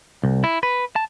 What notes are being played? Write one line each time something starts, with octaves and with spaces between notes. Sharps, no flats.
C2
E4
B4
A5